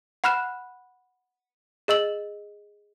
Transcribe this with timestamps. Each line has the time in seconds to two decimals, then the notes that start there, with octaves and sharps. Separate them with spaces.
0.24 F#5 B5 F6 F#6 E7
1.88 G#4 D#5 E6 F#7